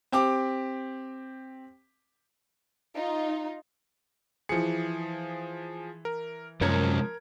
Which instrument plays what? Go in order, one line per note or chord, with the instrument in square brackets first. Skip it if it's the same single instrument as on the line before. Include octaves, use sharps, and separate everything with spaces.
[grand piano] C4 G4 D6
[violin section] D#4 F4
[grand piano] E3 C#7 [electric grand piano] F3 G#4
[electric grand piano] A#4
[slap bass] F#2 [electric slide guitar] C3 G#3 C#5 [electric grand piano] F3 [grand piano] A#4 G#6